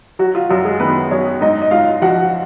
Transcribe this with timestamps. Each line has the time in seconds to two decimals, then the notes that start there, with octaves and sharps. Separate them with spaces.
0.19 F#3 F#4
0.35 F4
0.49 F#2 F#4
0.65 G#3 G#4
0.80 D#3 B3 B4
1.11 F#2 C#4 C#5
1.41 G#2 D#4 D#5
1.62 D#5
1.71 G#2 F4 F5
2.02 F3 F#4 F#5